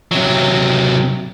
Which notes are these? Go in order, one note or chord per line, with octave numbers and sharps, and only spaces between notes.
C3 F#3